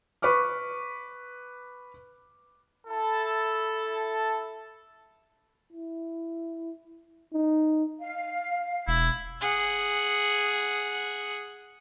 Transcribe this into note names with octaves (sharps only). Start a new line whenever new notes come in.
B4 C#6 D6 F6
E4 A4
E4
D#4
F5
E1 E4
G#4 F#5